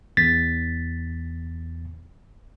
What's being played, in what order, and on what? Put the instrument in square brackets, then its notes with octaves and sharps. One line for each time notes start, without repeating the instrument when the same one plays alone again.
[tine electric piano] E2 A6 B6